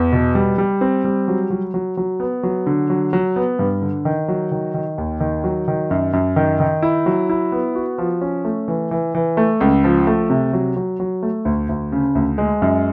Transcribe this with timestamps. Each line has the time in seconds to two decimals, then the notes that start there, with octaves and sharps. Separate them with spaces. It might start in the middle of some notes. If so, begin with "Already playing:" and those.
Already playing: E2
0.12 B2
0.35 G3
0.58 G3
0.81 C4
1.04 G3
1.28 F#3
1.50 F#3
1.74 F#3
1.97 F#3
2.20 B3
2.43 F#3
2.66 D3
2.90 F#3
3.13 F#3
3.36 B3
3.59 G2
3.82 D3
4.05 D#3
4.28 F#3
4.52 D#3
4.74 D#3
4.98 D#2
5.20 D#3
5.44 F#3
5.68 D#3
5.91 F#2
6.13 F#2
6.36 D#3
6.60 D#3
6.82 E4
7.06 F#3
7.29 E4
7.52 B3
7.75 F#4
7.98 F3
8.21 C#4
8.45 A3
8.68 E3
8.91 E3
9.15 E3
9.37 A3
9.60 C#2
9.84 F3
10.07 A3
10.30 C3
10.53 F#3
10.76 F#3
11.00 F#3
11.23 A3
11.45 D2
11.69 D2
11.92 C#3
12.15 D2
12.38 G#3
12.62 F#2